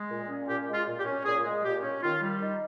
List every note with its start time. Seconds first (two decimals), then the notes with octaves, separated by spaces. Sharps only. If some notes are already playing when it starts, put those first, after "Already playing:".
Already playing: G#3
0.09 A#2
0.29 C#4
0.48 A#2 G4
0.67 G#3
0.74 F4
0.87 A#2
0.99 G4
1.06 C#4
1.25 A#2 G#4
1.45 G#3
1.64 A#2 G4
1.83 C#4
2.03 D#3 F4
2.22 G3
2.41 D#4